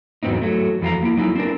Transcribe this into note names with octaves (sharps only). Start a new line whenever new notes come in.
E2 G#2 F#3 B3 C4 D#4
F#3 A3
F2 E3 F#4 F5 A#5
A#3 E4
F#3 D#4 E4
C4 D4 A#4